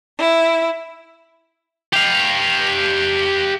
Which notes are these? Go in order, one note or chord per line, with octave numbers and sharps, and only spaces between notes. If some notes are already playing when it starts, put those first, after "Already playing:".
E4
G4 F5